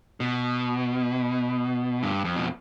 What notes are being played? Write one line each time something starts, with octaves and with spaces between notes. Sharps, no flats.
B2
G2
F2
B2